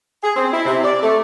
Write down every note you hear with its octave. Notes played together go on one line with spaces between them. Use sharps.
G#4
C4
E4
C3
D5
A3